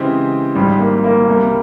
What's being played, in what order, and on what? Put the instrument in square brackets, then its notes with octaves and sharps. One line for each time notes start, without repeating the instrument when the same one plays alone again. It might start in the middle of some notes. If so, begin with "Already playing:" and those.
Already playing: [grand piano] C#3 E3 G#3 C4 G4
[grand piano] G#1 G#2 F3 [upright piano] G3
[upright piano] A#3
A#3
[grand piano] C2 C3 G3 [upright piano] A#3